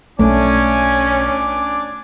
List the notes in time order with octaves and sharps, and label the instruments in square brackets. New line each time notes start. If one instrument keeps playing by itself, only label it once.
[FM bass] B1 [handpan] A3 [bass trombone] C#4 [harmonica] D4 G#5 D6